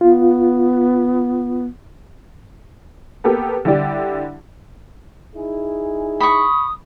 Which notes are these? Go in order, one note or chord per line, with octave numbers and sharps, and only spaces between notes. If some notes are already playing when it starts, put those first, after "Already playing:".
B3 F4
A#3 B3 G4 A4 A#4
D3 G3 E4 G4 D5
D#4 E4 G#4
B5 C#6 D#6